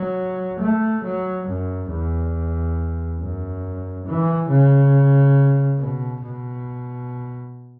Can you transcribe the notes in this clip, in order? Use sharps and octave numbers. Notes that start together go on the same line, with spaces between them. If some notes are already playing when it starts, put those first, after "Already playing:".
Already playing: F#3
A3
F#3
F#2
E2
F#2
E3
C#3
B2
B2